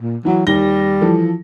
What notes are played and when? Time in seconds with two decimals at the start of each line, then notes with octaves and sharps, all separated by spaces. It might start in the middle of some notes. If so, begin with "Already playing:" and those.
0.01 A#2
0.25 E3 F#3 E4
0.47 D#2 G3 A#6 G7
1.01 E3 F3 A4